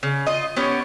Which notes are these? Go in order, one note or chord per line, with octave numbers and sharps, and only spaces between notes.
C#3
F4 D#5
B3 C#4 G4 C#5